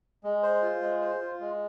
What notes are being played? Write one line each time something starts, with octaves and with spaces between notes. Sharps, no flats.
G#3
C5
F4
G#3
C5
F4
G#3